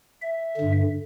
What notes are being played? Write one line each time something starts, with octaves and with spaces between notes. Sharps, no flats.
E5
G2 D3